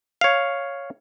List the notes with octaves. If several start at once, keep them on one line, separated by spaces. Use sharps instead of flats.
C#5 F5